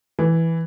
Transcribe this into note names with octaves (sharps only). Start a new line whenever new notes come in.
E3